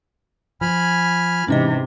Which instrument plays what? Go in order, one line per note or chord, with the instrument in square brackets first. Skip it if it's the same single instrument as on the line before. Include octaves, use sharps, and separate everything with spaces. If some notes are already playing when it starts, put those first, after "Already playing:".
[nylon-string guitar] F3 [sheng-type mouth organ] G#5 B5 F6
[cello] G#2 C3 [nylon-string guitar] E3 [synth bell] C#4 D#4 D#5